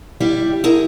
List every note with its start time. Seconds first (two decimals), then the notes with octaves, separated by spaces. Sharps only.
0.20 G3 E4 G4
0.64 E4 G#4 A#4